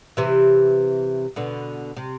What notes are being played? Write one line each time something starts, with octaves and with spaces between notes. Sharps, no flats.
C3 E3
B2 D3
C3